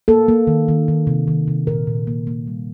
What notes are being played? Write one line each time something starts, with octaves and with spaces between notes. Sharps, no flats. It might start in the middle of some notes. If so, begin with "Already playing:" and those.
A#3 A4
A#3
D#3
D#3
D#3
C3
D#3
C3
A#2 A#4
A#2
A#3
A#3
G3